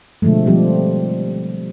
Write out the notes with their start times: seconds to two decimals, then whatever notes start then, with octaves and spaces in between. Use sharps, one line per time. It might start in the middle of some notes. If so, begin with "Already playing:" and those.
0.22 B2 D3 F3 G#3 A3
0.46 F3 G3 C4 G4